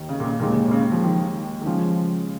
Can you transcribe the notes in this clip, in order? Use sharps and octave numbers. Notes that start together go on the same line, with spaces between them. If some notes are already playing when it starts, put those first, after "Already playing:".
Already playing: D#2 D#3
C#3
A#2
C#3
D#2 A#2 D#3 G#3
A#2
C#3
F3
D#3
D#3
C#3 F3 G#3 F4